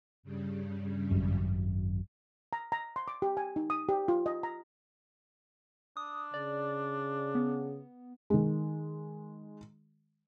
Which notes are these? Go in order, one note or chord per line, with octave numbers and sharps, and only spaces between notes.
G2 C#3 G3
G#1 F#2
A#5
A#5
C6
D6
G4
G#5
D#4
D#6
G4
F4
D#5
A#5
D4 D#6
C#3 D5
B3
D#3 G#3